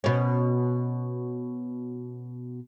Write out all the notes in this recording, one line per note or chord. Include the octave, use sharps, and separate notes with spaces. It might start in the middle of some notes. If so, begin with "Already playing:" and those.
B2 C#4